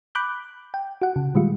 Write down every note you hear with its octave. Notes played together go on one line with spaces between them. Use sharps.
B5 D6 F#6 G6
G5
F#4 F#5
C#3
A#2 D#3 G3 G#3 F4